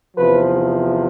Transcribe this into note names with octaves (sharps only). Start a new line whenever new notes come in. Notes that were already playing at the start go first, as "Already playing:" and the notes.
E2 C3 F3 B4